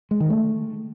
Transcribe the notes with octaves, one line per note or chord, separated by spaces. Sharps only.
G#3
D#3
A3